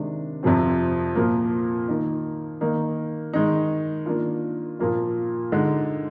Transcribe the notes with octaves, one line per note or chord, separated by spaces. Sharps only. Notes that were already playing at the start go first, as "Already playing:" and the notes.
Already playing: C3 D#3 G#3 D4
F2 C3 F3 C4
A#2 F3 A#3
D#3 A#3 D#4
D#3 A#3 D#4
D#3 G#3 D#4
D#3 A#3 D4 F4
A#2 F3 A#3 F4
D3 G#3 D#4